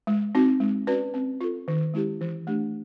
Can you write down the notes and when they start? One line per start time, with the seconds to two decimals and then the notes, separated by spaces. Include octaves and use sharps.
0.07 G#3
0.35 C4 D#4 F#4
0.60 G#3
0.87 C#4 F#4 B4 D5
1.14 C4
1.41 F4 A4
1.68 D#3
1.94 G#3 C#4 E4 G4
2.21 E3
2.47 A3 D4 G4